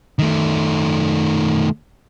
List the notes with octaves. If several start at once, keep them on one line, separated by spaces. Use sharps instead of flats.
D#3 A3